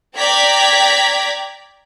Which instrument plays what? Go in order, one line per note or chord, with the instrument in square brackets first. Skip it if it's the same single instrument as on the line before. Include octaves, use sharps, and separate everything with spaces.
[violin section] D5 G5 A#5 G#6 B6